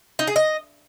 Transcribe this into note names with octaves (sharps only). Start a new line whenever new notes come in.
D#4
G#4
D#5